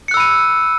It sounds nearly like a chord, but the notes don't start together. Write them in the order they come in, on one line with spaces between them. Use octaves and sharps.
C#7 F#6 E6 B5 D#7